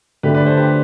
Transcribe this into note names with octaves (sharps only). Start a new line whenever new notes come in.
D3 A3 D4 G4 B4
B4 D5
A4 C5
G4 B4